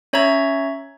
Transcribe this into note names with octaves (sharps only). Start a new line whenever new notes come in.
C#4 C#5 E5 A#5 G#6